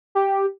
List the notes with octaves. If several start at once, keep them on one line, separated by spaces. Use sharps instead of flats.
G4